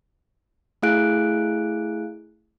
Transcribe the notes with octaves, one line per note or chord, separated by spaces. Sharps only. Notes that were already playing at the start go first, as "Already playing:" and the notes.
A3 E4 G#4 F5 F#6 D7